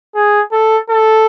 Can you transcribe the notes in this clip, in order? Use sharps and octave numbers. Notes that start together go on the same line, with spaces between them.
G#4
A4
A4